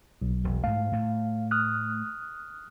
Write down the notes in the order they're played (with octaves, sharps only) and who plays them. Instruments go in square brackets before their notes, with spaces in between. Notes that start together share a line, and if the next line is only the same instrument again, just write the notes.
[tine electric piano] B1
[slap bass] E1
[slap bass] G#2 A3 [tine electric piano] F5
[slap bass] A2 A3
[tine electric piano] D#6 F6 F#6